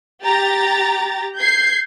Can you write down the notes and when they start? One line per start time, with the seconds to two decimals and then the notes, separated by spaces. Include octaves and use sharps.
0.23 G4 A#5 A6
1.35 G6 G#6 C7